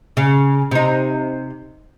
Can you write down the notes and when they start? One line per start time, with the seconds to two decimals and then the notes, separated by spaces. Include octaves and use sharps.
0.17 C#3
0.71 C3 D#4